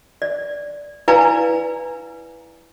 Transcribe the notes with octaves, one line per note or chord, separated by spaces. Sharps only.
D5
E4 B4 D5 F5 G#5 A#5